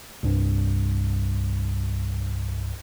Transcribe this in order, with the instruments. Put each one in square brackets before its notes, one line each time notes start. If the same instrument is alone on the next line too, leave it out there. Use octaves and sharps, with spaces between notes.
[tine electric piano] C2 G2